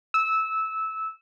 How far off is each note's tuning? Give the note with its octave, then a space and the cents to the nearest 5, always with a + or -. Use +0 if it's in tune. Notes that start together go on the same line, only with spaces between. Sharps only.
E6 -15